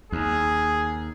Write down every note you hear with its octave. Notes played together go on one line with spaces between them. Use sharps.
D#2 G#4